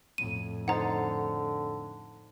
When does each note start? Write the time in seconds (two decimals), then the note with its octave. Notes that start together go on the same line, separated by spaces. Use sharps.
0.18 F2 A2 D#7
0.68 D3 D#4 C5 F#5 A#5 A6